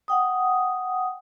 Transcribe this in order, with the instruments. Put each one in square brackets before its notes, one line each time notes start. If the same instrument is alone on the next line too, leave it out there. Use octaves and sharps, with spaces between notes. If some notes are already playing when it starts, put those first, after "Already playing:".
[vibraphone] F#5 G5 D#6